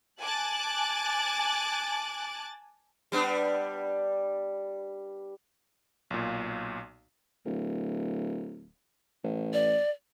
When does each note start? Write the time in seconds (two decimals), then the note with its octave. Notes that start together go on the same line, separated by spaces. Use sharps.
0.21 G#5 A5 D6 F#6 A6
3.12 G3 B3 D4
6.11 B1 A#2
7.46 D1
9.24 A1
9.53 D5